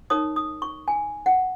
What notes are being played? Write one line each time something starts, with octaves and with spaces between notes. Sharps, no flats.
D#4 A#4 C#5 D#6
D#6
C#6
G#5
F#5